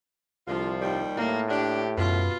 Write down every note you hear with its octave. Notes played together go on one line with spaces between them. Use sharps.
C2 D3 F3 F4
D#2 D#3 G3
A2 A#3
D4 G4
F#2 B2 F4